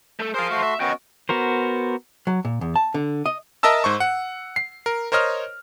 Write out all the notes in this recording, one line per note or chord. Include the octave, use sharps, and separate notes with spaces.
A3 A4
G#4 A#4 C5 F5 C6
A3 F#4 C6
E5
B3 C#4 F#4 D#5 G5
B3 F#4 A#4 C5
F#3
A#2
E2
A5
D3
D#5
A#4 D#5 E5 A5 E6
G#2 C5 C#6
F#5
C7
A#4
A#4 C5 C#5 D#5 F6